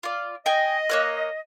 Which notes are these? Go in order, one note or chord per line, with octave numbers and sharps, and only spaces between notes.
F4 D5
D#5 G5 G#5
A#3 C#5 F#6